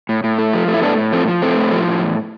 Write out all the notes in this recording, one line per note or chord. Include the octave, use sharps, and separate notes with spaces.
A2
A2
A3
F3
A3
E4
A2 B3 D4
A2
F3 A3 C4
F3
A2 A3 C4
A2
F3
A2
E2